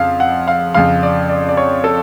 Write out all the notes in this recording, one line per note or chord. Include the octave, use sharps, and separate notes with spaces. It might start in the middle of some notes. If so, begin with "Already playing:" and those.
Already playing: F2 C#3 F5
F#5
F5
F2 C#3 F5
D5
D5
D5
C#5
A4